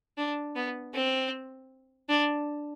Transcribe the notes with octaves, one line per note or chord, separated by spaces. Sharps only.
D4
B3
C4
D4